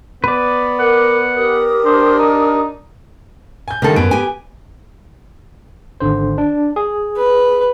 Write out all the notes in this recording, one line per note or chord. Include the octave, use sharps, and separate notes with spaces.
B3 B4 D5
A#4 F#5 D6
G4 A#4 D#6
D4 C5
D#4
G#5 G6
D3 D#3 G3 A#3 A4
F#2 B3 D7
G4 G#5
G#1 D3 C5
D4
G#4
B4